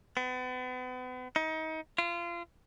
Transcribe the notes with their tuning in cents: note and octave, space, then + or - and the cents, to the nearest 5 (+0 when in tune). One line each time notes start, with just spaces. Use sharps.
B3 +40
D#4 +30
F4 -30